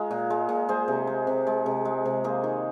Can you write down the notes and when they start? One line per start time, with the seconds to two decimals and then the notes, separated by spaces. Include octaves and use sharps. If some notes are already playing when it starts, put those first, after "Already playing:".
Already playing: G#3 F4 A#4
0.11 A#2
0.30 G#3
0.49 A#2
0.69 G#3 G#4 C5
0.88 C3
1.07 G#3
1.27 C3
1.47 G#3
1.66 C3
1.85 G#3
2.06 C3
2.24 A#3 G#4 C5
2.44 D#3